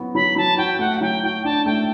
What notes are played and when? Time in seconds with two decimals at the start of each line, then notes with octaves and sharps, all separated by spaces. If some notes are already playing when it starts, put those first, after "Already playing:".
Already playing: F#3 B3 F#4
0.15 F#3 B5
0.36 F#3 A5
0.57 F#4 G5
0.79 A3 F#5
0.96 F#5
1.01 F#3 G5
1.23 F#4 G5
1.44 D4 A5
1.66 A3 G5